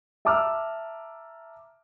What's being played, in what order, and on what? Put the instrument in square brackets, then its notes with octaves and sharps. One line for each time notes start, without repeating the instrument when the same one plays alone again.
[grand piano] E5 A5 A#5 D6 E6 F6